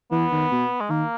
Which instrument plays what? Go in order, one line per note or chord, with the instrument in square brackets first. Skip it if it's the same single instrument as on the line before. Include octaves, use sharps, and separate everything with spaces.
[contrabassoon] E3 [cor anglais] B3
[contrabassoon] D#3
B2
[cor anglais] G#3
[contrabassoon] D#3 [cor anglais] A#3